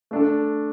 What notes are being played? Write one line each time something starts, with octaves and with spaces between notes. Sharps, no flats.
A3 D4 A4